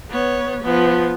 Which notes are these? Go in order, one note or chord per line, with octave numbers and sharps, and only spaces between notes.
B3 C#5
F3 B3